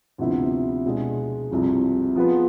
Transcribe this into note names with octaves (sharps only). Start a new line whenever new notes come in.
D2 C3 F3 B3 E4
B2 G#3 D4 G#4
C2 C3 F3
F3 B3 F4 G#4 B4